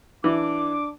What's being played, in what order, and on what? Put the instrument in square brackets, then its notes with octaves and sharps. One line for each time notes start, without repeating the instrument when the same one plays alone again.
[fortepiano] E3 [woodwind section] D4 D6